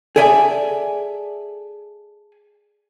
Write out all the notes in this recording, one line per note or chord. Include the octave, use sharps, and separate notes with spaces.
G#4 A4 D5 E5 G#5